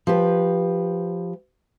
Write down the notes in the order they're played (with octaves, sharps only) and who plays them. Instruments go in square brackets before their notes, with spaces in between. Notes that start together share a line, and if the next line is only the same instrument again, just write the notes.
[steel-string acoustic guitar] F3 G4 B4